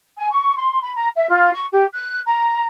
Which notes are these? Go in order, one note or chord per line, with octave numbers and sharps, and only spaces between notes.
G#5
C#6
C6
B5
A#5
E5
F4
C#6
G4
F#6
A#5